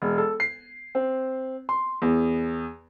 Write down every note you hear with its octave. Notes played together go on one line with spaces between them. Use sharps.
E1
A4
C7
C4
C6
E2